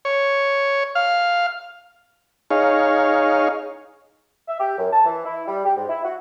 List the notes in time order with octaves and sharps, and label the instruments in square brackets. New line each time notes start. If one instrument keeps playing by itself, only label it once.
[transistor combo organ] C#5
F5
D#4 G#4 C#5 F5
[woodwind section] E5
G4
F#2
A5
E3
E4
G3
G4
G#2
E4
F#4